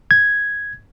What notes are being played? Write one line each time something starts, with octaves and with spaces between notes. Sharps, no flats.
G#6